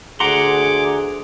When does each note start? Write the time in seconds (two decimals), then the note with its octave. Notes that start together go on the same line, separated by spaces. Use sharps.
0.20 D2 G#4 F#5 A#5 C6 D6